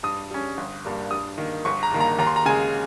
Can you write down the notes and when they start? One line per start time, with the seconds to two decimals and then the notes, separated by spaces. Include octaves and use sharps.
0.03 G2 D#6
0.31 G3 C#4
0.57 G1
0.85 G2 G3 A#3
1.11 G2 D#6
1.38 D#3 A#3
1.65 G1 C#6
1.83 A#5
1.91 G2 D#3 A#3
2.00 A#5
2.18 D#2 A#5
2.27 C6
2.36 A#5
2.46 C#3 G#3 G#5